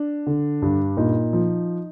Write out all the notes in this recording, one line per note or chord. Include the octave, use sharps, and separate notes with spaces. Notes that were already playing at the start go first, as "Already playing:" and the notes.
Already playing: D4
D3
G2
A#2 D#4
F3